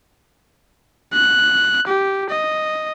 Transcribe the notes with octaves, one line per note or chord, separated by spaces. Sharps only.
F#6
G4
D#5